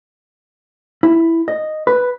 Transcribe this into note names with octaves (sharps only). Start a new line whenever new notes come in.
E4
D#5
B4